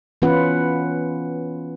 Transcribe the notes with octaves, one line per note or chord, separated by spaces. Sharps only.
E3 B3 C#4 F4 B4 F#5